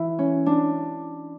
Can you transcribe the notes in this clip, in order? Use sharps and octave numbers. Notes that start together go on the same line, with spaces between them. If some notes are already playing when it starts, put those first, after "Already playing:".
Already playing: E3 E4
C#4
D4